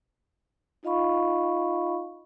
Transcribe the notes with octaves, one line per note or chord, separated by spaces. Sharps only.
D#4 F4 D#5 F5 B5 C#6